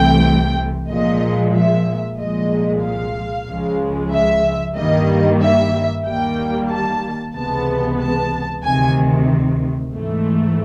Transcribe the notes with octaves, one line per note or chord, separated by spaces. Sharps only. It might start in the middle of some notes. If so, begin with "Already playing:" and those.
Already playing: C2 C3 E3 A3 G5
A#2 F3 G#3 D#5
E5
C2 A#2 F3 G#3 D#5
F5
C#2 C#3 F3 G#3
E5
G2 D#3 G3 A#3 D#5
E5
D#2 D#3 G3 A#3 G5
A5
C#2 C3 E3 G#3 B3 A5
A5
D2 C3 D#3 G#5
G#2 E3 A3